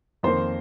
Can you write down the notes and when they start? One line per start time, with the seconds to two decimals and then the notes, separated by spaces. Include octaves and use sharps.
0.23 F2 D#3 A#3 C5